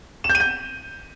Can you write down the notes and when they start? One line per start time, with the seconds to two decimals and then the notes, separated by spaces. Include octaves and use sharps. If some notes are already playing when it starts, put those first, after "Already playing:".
0.24 E7
0.29 G6
0.35 D#7
0.40 G6